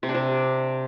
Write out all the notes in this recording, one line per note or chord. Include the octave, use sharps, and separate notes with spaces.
C3
D4
C3